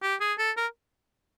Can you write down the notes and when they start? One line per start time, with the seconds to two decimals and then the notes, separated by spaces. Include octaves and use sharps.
0.03 G4
0.21 G#4
0.39 A4
0.57 A#4